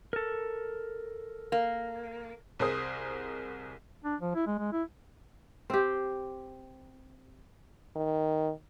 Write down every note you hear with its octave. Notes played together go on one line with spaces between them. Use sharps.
A4 A#4
A#3
C2 G#4 A#4 C5 D#6
D4
F3
E4
G#3
G#3
E4
C4 G4
D#3